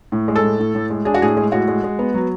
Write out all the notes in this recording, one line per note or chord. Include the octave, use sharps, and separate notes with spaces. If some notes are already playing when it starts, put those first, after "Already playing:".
A2
G#3
A4
A2
A2
A2
G#3
D4 G#4
F#4
A2 G#4
G#3
A2 F#4
G#3
G#3
B3
F#3